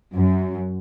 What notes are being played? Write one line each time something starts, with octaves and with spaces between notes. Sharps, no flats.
F#2